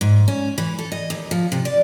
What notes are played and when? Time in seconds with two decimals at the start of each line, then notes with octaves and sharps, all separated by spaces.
0.01 G#2
0.28 C#4
0.58 E3
0.79 A4
0.92 D#5
1.10 D#2
1.31 F3
1.52 C3
1.65 D5